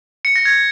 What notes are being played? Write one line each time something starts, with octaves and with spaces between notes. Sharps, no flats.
C#7
A#6
G#6